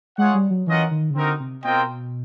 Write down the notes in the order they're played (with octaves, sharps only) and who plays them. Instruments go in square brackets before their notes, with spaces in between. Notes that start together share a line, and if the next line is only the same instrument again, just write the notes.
[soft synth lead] G#3 [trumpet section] F4 G#4 C#5 F#5
[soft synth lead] G3
F#3
[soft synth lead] E3 [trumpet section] C#4 F4 A#4 D#5 F#5
[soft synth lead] D#3
C#3
[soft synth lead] D3 [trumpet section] C4 D#4 F#4 A#4
[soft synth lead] C3
[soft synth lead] B2 [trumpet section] C4 F4 A#4 D#5 G5